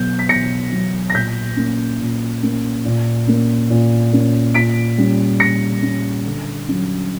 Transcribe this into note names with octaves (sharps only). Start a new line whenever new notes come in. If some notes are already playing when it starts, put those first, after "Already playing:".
Already playing: B2 F#3 B3 G6
B6
B2 A#6 C#7
F#3 B3
A#6
A#2 G6 B6
A#3 C#4
A#2
A#3 C#4
A#2
A#3 C#4
A#2
A#3 C#4
A#2 B6 D7
G3 C#4
A#2 A#6 C#7
G3 C#4
D3
F#3 C#4